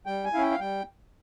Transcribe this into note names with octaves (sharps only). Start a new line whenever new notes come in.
G3 G5
G#5
C#4 E4 F5 G5
F5
G3 G5